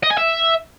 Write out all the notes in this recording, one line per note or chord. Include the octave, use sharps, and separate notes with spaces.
D#5
G#5
E5